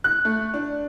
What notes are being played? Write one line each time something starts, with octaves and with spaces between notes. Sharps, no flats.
F#6
A3
D4